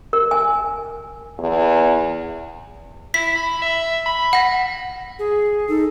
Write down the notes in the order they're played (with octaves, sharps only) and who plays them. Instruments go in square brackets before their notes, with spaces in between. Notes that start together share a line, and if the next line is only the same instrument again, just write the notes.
[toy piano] A#4
G#5
[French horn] E2
[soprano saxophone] E4 [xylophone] B6
[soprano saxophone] B5
E5
B5
[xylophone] F#5 A#6
[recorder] G#4
[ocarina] D#4 [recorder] A4